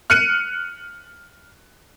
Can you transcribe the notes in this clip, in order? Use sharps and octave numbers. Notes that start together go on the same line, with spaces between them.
F6 F#6 C#7 D#7